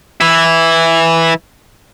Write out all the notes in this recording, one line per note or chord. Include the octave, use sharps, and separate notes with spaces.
E3 E4